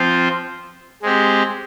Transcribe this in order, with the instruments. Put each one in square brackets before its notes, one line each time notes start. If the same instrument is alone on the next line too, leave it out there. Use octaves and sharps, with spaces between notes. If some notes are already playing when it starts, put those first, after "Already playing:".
Already playing: [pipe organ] F3 C4 F4 C5
G#3 C4 G4